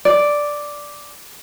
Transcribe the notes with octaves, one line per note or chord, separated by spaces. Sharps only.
D5